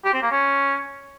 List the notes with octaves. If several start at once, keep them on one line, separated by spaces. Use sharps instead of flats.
G4
C4
A#3
C#4